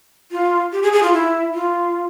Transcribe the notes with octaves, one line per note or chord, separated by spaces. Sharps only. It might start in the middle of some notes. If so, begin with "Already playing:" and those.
F4
G4
G#4
G#4
F4
E4
F4